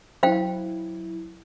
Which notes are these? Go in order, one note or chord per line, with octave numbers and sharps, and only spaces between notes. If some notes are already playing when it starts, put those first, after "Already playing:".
F#3 E4 C5 F5 G5